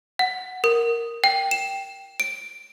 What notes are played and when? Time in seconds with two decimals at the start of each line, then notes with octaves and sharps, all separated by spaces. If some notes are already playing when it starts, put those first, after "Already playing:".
0.19 F#5
0.64 A#4
1.24 G5
1.51 E7
2.20 D7